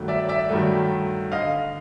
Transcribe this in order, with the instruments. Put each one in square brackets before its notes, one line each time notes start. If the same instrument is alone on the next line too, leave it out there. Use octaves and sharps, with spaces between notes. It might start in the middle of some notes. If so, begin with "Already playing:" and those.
Already playing: [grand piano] G2 D#3 F#3 A3
D5 E5
D5 E5
G2 D#3 F#3 A3
D3 D#5 F5